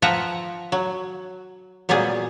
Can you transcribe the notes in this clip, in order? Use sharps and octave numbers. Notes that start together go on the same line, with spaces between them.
F3 B4 E5 F#5 G5 A#5
F#3
A#2 F#3 G3 B3 G#4